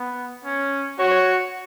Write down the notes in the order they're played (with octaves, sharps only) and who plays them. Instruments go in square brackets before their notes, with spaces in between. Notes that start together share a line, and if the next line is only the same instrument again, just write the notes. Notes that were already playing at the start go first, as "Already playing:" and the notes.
Already playing: [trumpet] B3
C#4
[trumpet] F#4 [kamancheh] C#5